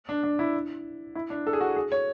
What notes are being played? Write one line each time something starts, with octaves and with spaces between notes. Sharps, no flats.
D4
D4
E4
E4
D4
A4
G#4
F#4
G#4
C#5